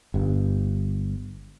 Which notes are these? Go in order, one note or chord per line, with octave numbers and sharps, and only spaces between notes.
G1 G2